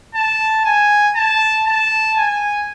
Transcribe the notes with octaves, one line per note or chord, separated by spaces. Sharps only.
A5
G#5
A5
A5
G#5